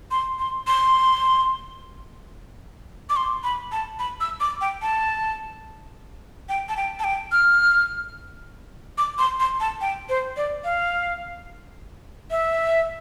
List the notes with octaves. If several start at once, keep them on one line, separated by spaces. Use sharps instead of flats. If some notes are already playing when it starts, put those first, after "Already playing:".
C6
C6
C6
D6
C6
B5
A5
B5
E6
D6
G5
A5
G5
A5
G5
A5
G5
F6
D6
C6
C6
A5
G5
C5
D5
F5
E5